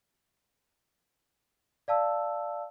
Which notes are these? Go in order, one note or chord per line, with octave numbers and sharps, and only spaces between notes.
D5 F5 A5 E6